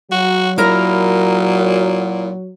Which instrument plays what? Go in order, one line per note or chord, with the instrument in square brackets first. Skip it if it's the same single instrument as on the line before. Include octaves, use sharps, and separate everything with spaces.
[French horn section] F#3 [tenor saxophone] F#4
[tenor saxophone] A#2 [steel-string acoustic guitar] E4 A#4 A#5